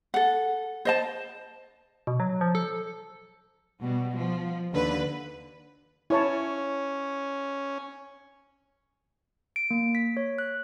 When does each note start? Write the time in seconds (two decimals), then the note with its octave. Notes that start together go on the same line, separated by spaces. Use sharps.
0.14 A4 F#5
0.85 C5 D#5 A5
2.07 B2
2.20 F#3
2.41 F3
2.55 A4
3.82 B2 G3
4.18 F3
4.72 D#2 D3 B4
6.10 C#4 E4 C#5 A5
9.56 D7
9.71 A#3
9.95 B6
10.17 C#5
10.38 F#6